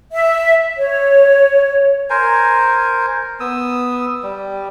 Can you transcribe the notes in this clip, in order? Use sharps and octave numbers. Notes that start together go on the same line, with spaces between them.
E5
C#5
A#4 C5 G#5
B3 D#6 E6
G3